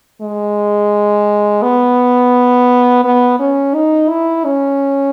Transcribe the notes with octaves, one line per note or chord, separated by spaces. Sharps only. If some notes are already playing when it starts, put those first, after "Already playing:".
G#3
B3
B3
C#4
D#4
E4
C#4